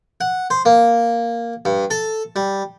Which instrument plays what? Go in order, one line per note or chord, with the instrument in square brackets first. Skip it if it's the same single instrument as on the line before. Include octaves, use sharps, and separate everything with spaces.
[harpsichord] F#5
C5
A#3
G2
A4
G3